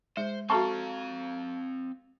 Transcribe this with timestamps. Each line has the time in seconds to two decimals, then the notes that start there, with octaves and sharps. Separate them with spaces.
0.17 G#3 C5
0.50 C4 F#4 A4 E5 F5 A5 A#5 C#6